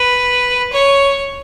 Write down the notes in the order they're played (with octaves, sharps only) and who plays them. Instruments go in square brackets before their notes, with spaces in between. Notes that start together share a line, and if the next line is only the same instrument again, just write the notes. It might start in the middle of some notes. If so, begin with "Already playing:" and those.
Already playing: [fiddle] B4
C#5